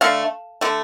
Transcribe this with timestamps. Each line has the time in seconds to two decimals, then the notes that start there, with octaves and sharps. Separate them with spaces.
0.01 D3 A3 F5
0.61 D3 A3